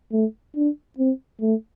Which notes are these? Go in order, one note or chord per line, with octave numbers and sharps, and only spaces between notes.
A3
D4
C4
A3